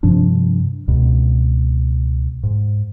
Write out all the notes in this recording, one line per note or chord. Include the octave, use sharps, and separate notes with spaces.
G2 C3 F3 D4
C#2 B2
G#2